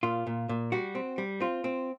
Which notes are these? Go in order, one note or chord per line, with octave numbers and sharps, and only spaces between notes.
A#2 F4
A#2
A#2
G3 F#4
C4
G3
C4 F4
C4